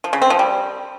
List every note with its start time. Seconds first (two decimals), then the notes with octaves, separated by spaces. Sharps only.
0.04 F3
0.13 C#3
0.22 C4
0.30 F3
0.39 G3